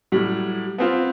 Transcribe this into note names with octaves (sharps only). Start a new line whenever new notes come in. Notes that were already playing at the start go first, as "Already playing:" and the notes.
A2 F#3 G3
B3 C4 F4